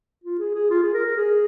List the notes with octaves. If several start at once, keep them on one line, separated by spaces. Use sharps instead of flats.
F4
G#4
G#4
F4
G#4
A#4
A#4
G#4